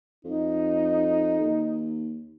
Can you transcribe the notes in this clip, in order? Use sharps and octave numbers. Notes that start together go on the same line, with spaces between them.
F2 D#4
D#2